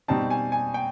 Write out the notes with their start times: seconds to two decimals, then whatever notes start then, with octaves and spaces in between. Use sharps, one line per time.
0.08 B2 G3 C4 D#4 A5
0.30 G#5
0.52 G#5
0.74 G5